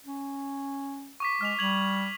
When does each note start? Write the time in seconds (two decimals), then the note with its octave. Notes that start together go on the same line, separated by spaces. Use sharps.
0.05 C#4
1.20 C#6 D6 B6
1.41 G#3 F6 B6 F7
1.59 G3 G#6 F7 F#7